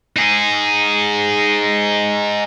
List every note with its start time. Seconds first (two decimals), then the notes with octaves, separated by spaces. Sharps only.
0.16 D#4 G#4